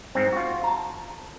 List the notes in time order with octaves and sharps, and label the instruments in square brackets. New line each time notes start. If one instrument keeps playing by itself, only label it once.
[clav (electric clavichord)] G#2 C4
F4 F#4
A5 A#5